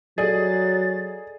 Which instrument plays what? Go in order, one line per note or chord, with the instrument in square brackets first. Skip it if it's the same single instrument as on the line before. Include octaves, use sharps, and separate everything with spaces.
[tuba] F#3 [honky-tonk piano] G#4 [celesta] A4 D5 D#5 [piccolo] A6